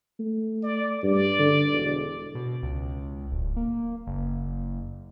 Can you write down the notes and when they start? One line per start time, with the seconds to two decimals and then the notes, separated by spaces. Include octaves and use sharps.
0.19 A3
0.63 D5
1.03 G2 D5
1.39 D3
1.72 E1
2.35 B2
2.63 C#2
3.32 D1
3.57 A#3
4.07 F#1